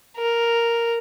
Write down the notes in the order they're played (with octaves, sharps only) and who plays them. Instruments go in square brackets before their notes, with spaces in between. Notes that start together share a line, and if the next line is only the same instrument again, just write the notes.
[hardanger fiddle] A#4